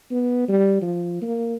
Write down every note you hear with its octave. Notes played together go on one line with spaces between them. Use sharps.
B3
G3
F3
A#3